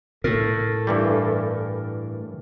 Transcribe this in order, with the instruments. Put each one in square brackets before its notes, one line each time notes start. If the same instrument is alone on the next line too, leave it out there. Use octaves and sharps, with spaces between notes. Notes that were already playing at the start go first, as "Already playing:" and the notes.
[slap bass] A2 [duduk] A4 [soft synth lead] A#4
[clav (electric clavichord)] G2 E3 G3